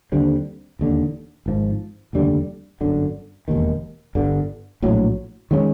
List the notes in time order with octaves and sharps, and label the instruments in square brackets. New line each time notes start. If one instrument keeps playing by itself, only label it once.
[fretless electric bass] D#2 D3 G3 C4
E1 D#2 D3
G#1 G#2 F3
F1 D#2 D3 G3
G1 F#2 D3
E1 D#2 D#3
G1 G2 D3
A#1 A2 F#3
D#3 G#3 C#4